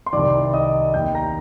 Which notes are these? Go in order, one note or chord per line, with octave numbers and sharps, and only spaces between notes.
C6
C2 C3 D#3 D5 D6
D#5 D#6
D#2 D#3 G5 G6
A#5 A#6